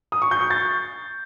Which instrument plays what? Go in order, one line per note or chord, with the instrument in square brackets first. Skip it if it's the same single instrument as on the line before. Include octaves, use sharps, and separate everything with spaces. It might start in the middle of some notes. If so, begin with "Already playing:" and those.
[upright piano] D#6
C#6
G6
C#6
A6